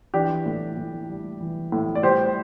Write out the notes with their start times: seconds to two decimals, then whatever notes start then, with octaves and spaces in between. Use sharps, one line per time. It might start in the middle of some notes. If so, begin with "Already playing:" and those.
0.14 E3 D4 G4
0.46 A2
0.77 A2
1.09 G3
1.41 E3
1.72 A2
1.95 D5
2.03 G3 G4 C5